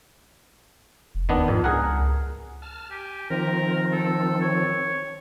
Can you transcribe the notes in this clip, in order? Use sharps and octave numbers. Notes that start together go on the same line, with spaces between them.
F1
D#2 D#3 B3 D4
F2 G#2
C#2 G#4 A#4 F#5
A5 F6
G4 G#5
D#3 F3 C4 A#4
A4
C#5